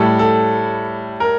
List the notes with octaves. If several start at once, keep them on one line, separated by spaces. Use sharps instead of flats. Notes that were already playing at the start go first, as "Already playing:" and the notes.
Already playing: A2 G3 A4
A4
A#4